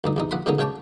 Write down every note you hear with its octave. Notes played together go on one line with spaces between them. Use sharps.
D2 G2 D#4
E2 C3 D#4
A#1 F#5 B5 C6
B2 D3 G#3 A#3 C#4 D#4
C#3 G#3 C#5 G5 A5 D6